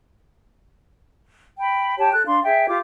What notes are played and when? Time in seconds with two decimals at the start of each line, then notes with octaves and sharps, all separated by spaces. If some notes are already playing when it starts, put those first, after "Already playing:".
1.59 G5 B5
1.98 G4 C#5 G5 A5
2.14 A4 F#6
2.27 D4 F5 C6
2.44 G#4 E5 G5
2.68 F4 G4 D6